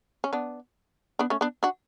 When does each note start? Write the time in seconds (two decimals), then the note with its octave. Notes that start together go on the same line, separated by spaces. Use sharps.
0.24 C#4
0.33 B3 D4
1.19 B3 D4
1.30 A3 C#4
1.41 B3 D4
1.63 D4 F#4